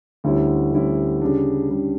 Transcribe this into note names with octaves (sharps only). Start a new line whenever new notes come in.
D2 D3 G3 C#4 E4
D2 D3 G3 C#4 E4
C#3 G3 D4
C#3 G3 D4